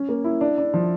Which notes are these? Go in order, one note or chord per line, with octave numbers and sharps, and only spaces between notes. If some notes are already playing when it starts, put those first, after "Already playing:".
Already playing: C#4
A#3
E4
D4
D4
F3